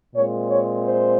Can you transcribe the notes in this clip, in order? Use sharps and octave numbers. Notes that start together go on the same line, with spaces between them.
A#2 G#3 C4 C#5
C#5
C5